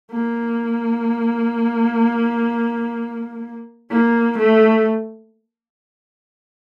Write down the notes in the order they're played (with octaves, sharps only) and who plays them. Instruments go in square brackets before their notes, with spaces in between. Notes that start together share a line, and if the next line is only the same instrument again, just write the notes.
[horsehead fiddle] A#3
A#3
A3